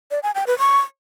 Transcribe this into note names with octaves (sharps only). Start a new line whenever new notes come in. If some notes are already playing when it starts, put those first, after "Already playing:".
D5
G#5
G5
B4
C#6